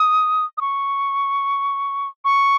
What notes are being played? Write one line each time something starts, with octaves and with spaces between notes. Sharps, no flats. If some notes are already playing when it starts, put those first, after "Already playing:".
Already playing: D#6
D#6
C#6
C#6